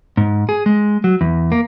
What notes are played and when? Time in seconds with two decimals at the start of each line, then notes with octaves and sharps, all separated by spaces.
0.17 G#2
0.49 G#4
0.66 G#3
1.04 F#3
1.21 E2
1.52 A#3